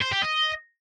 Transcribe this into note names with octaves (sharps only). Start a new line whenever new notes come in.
C5
G4
D#5